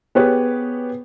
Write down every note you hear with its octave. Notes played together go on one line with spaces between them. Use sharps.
B3 G4 G#4 B4 C#5